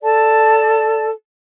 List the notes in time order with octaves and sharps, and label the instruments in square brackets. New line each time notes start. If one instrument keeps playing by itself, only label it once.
[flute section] A4 D5 A5